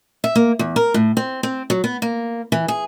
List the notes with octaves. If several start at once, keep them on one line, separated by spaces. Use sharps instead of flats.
E5
A#3
E2
A#4
A2
C4
C4
F#3
B3
A#3
E3
G#4